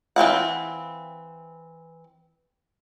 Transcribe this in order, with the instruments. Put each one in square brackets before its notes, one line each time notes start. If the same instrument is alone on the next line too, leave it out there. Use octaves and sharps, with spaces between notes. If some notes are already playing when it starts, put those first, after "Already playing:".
[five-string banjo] E3 C4 F5 F#5